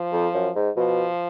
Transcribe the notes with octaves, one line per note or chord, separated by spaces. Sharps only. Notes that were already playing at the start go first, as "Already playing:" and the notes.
Already playing: F3
F2
F#2
G#2
B2 F3